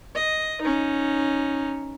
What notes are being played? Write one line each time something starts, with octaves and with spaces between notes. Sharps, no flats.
D#5
C#4 D#4